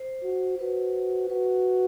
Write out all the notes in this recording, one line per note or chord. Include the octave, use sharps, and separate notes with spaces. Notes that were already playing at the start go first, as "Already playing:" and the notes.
Already playing: C5
F#4
F#4 B4
F#4 B4